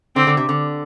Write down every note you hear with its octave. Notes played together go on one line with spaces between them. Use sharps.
D3 C4
D3
C3
D3